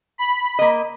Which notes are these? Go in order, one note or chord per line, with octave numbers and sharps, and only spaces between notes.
B5
A#3 D#5